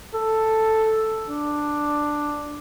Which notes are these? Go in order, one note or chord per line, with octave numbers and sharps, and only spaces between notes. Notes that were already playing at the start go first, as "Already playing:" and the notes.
A4
D4